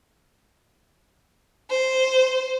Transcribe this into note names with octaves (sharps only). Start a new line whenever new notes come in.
C5